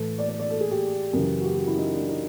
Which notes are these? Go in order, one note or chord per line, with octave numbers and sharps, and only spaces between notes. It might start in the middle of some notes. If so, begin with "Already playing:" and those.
Already playing: A2 E3 A4
D5
D5
D5
A4
G#4
G4
F#2 C#3 E3
F#4
G4
F#4
E4
D#4
D4
D#4